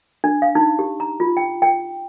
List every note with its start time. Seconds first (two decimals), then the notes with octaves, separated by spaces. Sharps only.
0.24 D4
0.42 F5
0.55 D#4
0.79 G4
1.00 A#5
1.20 F4
1.37 G5
1.62 G5